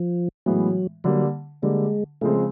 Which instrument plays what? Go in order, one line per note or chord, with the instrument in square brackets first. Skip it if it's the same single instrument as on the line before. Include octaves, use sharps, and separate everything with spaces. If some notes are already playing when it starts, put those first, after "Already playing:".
Already playing: [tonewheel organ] F3
[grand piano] A2 E3 G#3 B3 [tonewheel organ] F#3
[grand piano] D3 G3 A#3 [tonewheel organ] F#3
[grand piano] D3 G3 A#3 [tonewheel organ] G#3
[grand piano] C#3 F3 G#3 C4 [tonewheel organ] A3